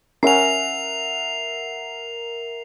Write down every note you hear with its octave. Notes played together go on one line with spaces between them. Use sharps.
C#4 A#4 E5 F#5 C7 F7